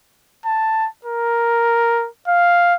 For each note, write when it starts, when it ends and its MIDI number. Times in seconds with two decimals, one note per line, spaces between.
0.46 0.88 81
1.05 2.08 70
2.28 2.75 77